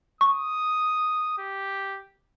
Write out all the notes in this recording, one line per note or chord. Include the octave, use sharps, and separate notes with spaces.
C#6 D#6
G4